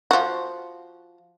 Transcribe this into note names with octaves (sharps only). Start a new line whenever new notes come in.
F3 F#4